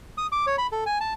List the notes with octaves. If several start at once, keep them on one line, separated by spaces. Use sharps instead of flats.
D#6
D6
C#5
B5
A4
G#5
A5